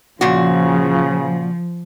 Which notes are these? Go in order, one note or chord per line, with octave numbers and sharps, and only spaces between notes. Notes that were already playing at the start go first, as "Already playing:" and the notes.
A#2 C#3 F3 F#4